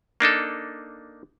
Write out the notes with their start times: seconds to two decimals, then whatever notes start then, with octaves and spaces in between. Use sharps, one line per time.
0.20 A#3 D4 D#4 A4